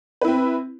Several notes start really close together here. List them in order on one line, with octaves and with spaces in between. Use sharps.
B4 E4 C4